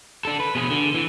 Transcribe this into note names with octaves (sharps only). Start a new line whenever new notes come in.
D4 A4
B4
B2 G#4
D3
E3